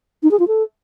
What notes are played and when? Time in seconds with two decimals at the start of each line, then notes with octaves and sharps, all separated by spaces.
0.23 D#4
0.31 G#4
0.39 F4
0.48 A4